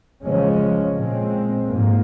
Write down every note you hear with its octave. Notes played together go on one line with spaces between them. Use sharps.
C#3 F3 G#3 C#4
A#2 G#3 C4
G#2 F3 A#3